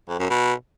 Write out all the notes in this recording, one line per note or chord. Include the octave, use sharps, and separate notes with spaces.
F2
F#2
B2